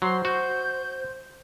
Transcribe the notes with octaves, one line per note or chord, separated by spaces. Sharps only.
F#3 C5 C6
F#4 G6